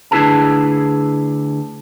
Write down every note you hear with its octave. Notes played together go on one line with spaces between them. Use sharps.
D2 D4 E4 G#4 B4 A5